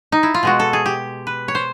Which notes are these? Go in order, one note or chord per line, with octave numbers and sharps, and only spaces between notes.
D#4
E4
F4
B2 G#3 F#4
A4
G#4
G4
B4
C#5
C5